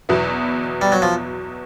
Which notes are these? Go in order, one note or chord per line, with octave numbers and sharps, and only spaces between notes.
E2 B2 F#3 B3 E4
G3
F#3
F3